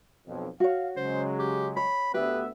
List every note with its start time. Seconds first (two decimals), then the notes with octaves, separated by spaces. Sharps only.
0.27 B1 F2
0.60 F#4 C#5 F5
0.96 C#3 F#3 G#3 C5
1.39 G4
1.77 C#5 B5
2.14 D2 B3 G4 B4 E5